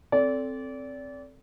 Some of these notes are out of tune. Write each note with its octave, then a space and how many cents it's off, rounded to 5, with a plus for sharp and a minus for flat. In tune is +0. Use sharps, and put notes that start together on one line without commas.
C4 +0 A4 +0 D5 -30